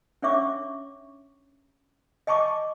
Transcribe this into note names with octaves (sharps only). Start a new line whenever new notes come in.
C#4 D4 C#5 E5 C#6 D6
D#5 G#5 A5 C#6 D6